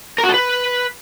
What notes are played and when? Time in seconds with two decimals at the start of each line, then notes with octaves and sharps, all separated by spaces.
0.18 A#4
0.24 F#4
0.29 A4
0.34 B4